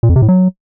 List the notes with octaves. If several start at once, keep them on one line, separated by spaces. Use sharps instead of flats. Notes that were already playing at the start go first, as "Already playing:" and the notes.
A#2
F2
C3
A2
F#3